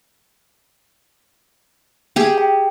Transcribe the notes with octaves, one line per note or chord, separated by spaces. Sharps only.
G4 G#4
G5